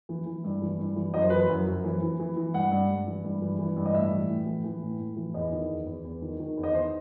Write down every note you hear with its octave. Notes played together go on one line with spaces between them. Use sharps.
E3
E3
G2
E3
G2
E3
F#2 D#5
C5
E3 B4
C5
F#2
F#2
E3
E3
E3
E3
G2 F#5
G2
G2
E3
G2
E3
E3
G2
D#5
A2 E5
E3
A2
E3
E3
A2
A2
E3
E2 D#5
D#3
E2
E2
E2
D#3
D#3
E2
D#5
D#3 C5